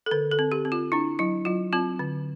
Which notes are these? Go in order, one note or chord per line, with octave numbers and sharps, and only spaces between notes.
A4
D3 A#4
A4
C4
G4
C4
F4
D4 E4
F#3 E4
F#3 F4
C4 F4
D3